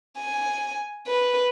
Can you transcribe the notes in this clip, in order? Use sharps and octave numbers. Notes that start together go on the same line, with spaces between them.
G#5
B4